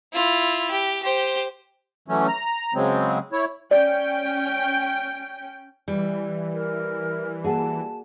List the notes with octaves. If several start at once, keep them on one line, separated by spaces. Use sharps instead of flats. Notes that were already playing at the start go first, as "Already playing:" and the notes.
E4 F4
G4
G4 C5
E3 F#3 A3 C#4
A#5
C#3 F#3 G#3 C4
E4 C#5
C#4 D5 G5
E3 G3
A#4
A#3 F#4 G#4 A5